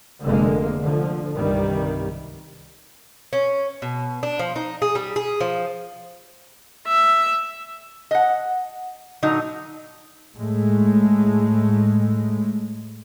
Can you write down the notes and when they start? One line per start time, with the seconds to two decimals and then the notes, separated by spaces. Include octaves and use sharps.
0.23 F1 D3 G#3 A#3
0.83 D3 F3
1.37 C2 G2 D#3 G3
3.33 C#4
3.82 B2
4.23 D4
4.39 F3
4.56 D#4
4.82 G#4
4.95 G3
5.16 G#4
5.40 F3
6.87 E5
8.11 D#5 F#5
9.22 A#2 D3 F#3 D#4
10.35 A2 G#3 A3